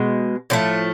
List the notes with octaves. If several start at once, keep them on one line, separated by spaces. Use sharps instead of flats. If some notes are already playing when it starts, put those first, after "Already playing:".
Already playing: B2 G#3
A2 F3 A3 C4